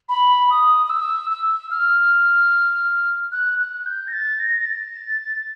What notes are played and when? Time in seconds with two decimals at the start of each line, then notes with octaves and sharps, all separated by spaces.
0.09 B5
0.50 D#6
0.86 D#6
0.89 E6
1.31 E6
1.71 F6
3.32 F#6
3.58 F#6
3.86 G6
4.07 A#6
4.13 A6
4.40 A#6
4.59 A#6
4.66 A6